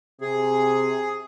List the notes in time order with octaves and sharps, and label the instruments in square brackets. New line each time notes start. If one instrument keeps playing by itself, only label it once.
[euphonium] C3 [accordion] G#4